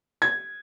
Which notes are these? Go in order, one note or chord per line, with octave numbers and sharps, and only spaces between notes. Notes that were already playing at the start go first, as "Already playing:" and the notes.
G#6